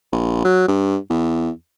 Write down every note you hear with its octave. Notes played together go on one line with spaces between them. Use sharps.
A#1
F#3
G2
E2